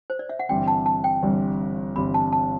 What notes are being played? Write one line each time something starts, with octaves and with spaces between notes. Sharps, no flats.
C5
D5
E5
F#5
G1 G2 E3 G3 C4 G5
A5
A5
G5
G1 G2 E3 G3 C4
G1 G2 E3 G3 C4 B5
A5
A5